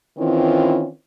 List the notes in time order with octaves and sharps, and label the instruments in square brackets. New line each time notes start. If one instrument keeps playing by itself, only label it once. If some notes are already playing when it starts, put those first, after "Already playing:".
[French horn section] D#3 E3 C4 C#4 E4 F4